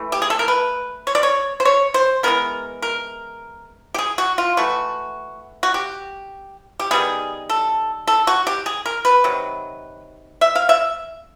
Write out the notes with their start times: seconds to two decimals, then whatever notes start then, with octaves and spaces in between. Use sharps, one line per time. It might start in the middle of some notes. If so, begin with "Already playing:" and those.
Already playing: E3 A3
0.12 G4
0.22 G#4
0.30 A4
0.39 A#4
0.48 B4
1.07 C#5
1.15 D5
1.23 C#5
1.60 C5
1.65 C#5
1.94 C5
2.23 E3 G#3 B3 A#4
2.82 A#4
3.94 G4
3.98 G#4
4.18 F#4
4.38 F4
4.57 E3 A3 F#4
5.63 F#4
5.74 G4
6.80 G4
6.91 D#3 G3 B3 G#4
7.49 A4
8.07 A4
8.27 F#4
8.47 G4
8.66 G#4
8.86 A#4
9.05 B4
9.24 C3 D#3 F#3
10.41 E5
10.55 F5
10.69 E5